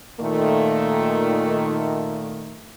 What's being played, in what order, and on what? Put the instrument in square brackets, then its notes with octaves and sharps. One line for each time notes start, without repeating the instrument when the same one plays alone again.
[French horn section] A#2 D#3 A3